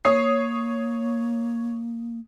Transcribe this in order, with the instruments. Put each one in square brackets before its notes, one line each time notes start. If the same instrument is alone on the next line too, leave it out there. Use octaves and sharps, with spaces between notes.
[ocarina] A#3 [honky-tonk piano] C#5 D#6 C7